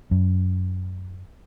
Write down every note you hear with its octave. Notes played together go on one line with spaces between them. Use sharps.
F#2